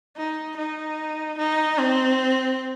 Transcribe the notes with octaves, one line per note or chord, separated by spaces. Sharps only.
D#4
D#4
D#4
C4